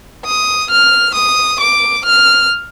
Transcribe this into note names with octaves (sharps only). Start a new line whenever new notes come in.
D#6
F6
D#6
D6
F6